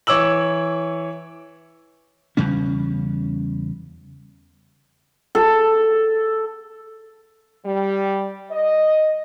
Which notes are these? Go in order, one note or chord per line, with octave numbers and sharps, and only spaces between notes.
E3 C#5 D6 E6 F#7
E2 C#3 G3 C#4
A4
G3
D#5